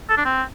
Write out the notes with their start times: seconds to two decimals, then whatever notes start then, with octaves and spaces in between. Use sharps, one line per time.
0.10 A4
0.18 D4
0.26 C4